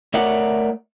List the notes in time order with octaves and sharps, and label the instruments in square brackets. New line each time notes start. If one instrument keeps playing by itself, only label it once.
[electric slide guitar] A3 A#4 C#5 D5 E5 F#5